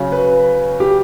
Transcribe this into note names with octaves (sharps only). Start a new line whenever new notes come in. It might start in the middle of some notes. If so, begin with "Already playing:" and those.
Already playing: C#3 F#3 C#4
B4
G4